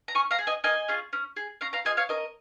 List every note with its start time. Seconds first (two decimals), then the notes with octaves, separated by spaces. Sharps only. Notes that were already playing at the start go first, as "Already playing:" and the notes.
0.08 A#5
0.15 C#4 G#5 C#6
0.31 F5 A#5
0.39 G#4
0.47 D#5 G#5
0.64 A#3 D#5 G#5
0.88 C#4 F4 G#4
1.13 C#4
1.36 G#4
1.61 C#4 F5 A#5
1.73 F5 A#5
1.85 F4 G#4 D#5 G#5
1.97 C#5 F5
2.09 C#4 A#4 D#5